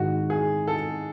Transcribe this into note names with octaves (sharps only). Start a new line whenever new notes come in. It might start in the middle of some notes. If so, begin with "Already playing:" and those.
Already playing: G#2 D#3 G#3 F#4
G#4
A4